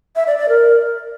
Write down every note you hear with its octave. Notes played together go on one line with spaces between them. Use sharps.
E5
D5
D5
A#4